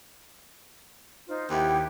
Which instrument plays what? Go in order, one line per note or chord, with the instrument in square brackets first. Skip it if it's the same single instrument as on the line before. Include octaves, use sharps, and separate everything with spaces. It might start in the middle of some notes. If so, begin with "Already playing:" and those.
[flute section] D#4 F4 C5
[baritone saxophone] D#2 [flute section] E4 G4 F#5